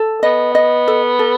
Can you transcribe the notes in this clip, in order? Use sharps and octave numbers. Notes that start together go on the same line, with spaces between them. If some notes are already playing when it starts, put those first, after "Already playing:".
Already playing: A4
B3 D#5
D#5
A4
A4